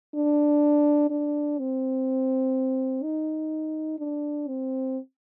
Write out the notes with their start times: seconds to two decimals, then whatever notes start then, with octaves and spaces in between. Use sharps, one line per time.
0.15 D4
1.10 D4
1.59 C4
3.03 D#4
3.99 D4
4.48 C4